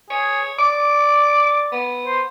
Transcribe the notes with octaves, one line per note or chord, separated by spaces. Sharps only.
G#4 C#5
D5 D6
B3
C5